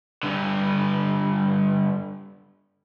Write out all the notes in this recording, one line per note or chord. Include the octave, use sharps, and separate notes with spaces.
G2 D3